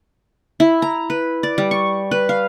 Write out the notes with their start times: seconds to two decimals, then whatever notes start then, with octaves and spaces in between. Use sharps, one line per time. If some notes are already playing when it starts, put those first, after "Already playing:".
0.60 E4
0.82 A#5
1.10 B4
1.43 D5
1.58 G3
1.71 C#6
2.11 B4
2.29 F5